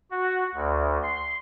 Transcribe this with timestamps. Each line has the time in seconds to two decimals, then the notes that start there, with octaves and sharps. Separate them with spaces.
0.11 F#4
0.55 D2
1.03 C6